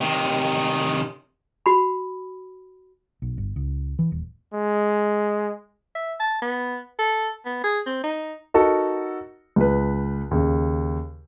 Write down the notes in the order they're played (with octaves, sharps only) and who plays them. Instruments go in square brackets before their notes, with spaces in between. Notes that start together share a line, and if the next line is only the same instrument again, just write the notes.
[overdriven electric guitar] C3 D#3
[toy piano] F#4 B5
[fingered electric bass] B1
G1
C#2
E3
D#1
[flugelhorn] G#3
[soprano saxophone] E5
A5
B3
A4
B3
G#4
C4
D#4
[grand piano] D#4 F#4 A4 A#4
C#2 B4
D#2 C#3